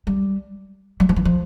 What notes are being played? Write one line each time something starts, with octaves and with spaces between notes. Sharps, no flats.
G3
F#3
F3
E3
F3